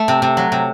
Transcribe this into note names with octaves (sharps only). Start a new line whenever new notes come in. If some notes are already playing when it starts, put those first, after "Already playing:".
Already playing: A3
C3
C3
F#3
C3